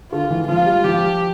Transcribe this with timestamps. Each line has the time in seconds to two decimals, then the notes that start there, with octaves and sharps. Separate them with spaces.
0.12 D3 F4
0.30 E3
0.48 F3 F4
0.66 G3
0.84 F3 G4